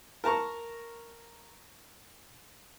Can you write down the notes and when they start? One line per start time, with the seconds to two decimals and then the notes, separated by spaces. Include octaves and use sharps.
0.24 A#4 A5 A#5 C#6